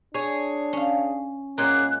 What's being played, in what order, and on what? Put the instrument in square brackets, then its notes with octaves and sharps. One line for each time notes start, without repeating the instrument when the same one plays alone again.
[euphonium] D4 [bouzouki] G#4 C#5
[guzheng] C#4 F5
[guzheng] A#2 G#3 [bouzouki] A#3 G#4 F#5 [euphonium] C#4 [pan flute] F#6